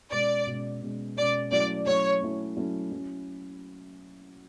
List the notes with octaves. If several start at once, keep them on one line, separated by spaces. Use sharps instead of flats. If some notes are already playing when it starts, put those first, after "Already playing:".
B2 G#3 C#4 D5
B2 G#3 C#4
B2 G#3 C#4
B2 G#3 C#4 D5
F#3 A3 C#4 E4 D5
F#3 A3 C#4 E4 C#5
F#3 A3 C#4 E4
F#3 A3 C#4 E4
F#3 C#4 E4